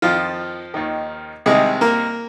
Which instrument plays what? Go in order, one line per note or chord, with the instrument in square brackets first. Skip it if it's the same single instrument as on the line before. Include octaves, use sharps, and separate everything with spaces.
[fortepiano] F2 D#3 F3 F4
D#2 D#3
C2 C3 D#3 G#3 G#4
A#3 A#4